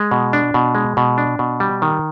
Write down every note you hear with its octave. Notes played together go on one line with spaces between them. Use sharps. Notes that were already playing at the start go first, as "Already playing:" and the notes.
Already playing: G#3
B2
D4
B2
G#3
B2
D4
B2
G3
D#3